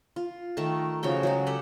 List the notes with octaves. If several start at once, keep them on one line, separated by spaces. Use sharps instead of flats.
F4
D#3 A3 A#4 A5
C#3 F3 F#4 G5
F#3 G#3 F#4
G4 A4 D5 F#5